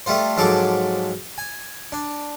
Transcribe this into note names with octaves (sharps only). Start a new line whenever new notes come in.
G3 A3 F4 C5
G#2 F3 F#3 A4 D6
G#5
D4